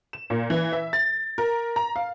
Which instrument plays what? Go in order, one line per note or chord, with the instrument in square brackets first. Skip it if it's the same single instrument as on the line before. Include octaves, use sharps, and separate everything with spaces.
[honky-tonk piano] E7
A#2
E3
E5
A6
A#4
A#5
F5